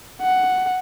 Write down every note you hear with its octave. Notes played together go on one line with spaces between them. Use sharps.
F#5